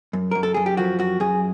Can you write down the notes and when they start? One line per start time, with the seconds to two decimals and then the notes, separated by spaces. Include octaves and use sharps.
0.13 F#2
0.31 F#2 A#4
0.43 A4
0.54 F#2 G#4
0.66 G4
0.77 F3 F#4
0.99 F#2 F#4
1.20 F#2 G#4